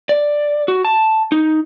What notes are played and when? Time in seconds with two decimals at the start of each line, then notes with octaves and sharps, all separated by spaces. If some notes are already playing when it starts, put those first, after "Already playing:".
0.09 D5
0.68 F#4
0.85 A5
1.32 D#4